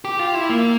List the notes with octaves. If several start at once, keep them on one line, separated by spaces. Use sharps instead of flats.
G4
F4
E4
A#3